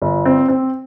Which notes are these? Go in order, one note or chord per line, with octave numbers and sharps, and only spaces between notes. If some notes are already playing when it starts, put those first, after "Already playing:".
G1
C4
C4